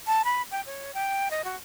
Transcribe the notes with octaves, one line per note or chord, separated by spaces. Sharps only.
A5
B5
G5
C#5
G5
D#5
F#4